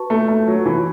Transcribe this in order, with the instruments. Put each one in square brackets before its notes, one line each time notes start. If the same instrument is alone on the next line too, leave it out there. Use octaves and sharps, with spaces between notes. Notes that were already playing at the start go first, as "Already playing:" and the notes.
Already playing: [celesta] F#4 B4 A5 C#6
[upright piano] A3
A3
F#3
E3